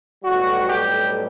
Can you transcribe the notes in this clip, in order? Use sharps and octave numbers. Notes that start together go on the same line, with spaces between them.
B1 A2 G3 F#4
G4